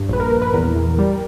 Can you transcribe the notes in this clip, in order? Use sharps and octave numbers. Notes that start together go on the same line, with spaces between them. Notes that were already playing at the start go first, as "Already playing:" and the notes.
Already playing: G2
A#1 B4
A#4
A#1 A#4
B4
E2 A#4
E2
G3